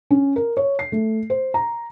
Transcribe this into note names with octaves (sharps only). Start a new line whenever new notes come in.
C#4
A#4
C#5
C7
A3
C5
A#5